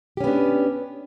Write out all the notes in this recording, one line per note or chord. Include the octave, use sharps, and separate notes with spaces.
B3 C#4 D4 G4